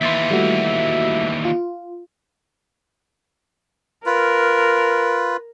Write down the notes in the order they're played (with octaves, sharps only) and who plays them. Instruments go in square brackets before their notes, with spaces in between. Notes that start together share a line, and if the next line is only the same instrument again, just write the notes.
[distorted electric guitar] D#2 E3 [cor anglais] E5 [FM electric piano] C6 A6 B6
[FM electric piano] G3 A3 F#4
F4
[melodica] F4 B4 [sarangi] A#4